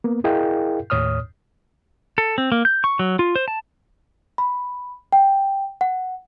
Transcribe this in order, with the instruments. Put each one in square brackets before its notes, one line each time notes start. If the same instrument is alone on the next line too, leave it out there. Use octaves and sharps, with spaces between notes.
[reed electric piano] A#3 B3
E4 G#4 A#4 D#5 F5 G5
D#2 A2 C#5 D#6 F6
[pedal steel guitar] A4
C4
A#3
G6
C#6
F#3
F4
C5
A5
[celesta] B5
G5
F#5